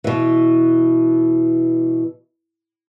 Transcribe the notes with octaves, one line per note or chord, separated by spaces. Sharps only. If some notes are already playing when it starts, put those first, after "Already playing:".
B2 E3